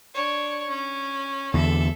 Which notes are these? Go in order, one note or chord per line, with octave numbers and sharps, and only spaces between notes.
D4 C#5
C#4
E2 D3 A4 E5